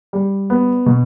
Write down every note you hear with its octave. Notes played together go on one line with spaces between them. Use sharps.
G3
B3
B2